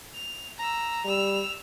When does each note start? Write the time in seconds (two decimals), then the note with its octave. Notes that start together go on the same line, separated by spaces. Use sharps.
0.14 F7
0.58 A#5 E6
1.05 G3 E6 F7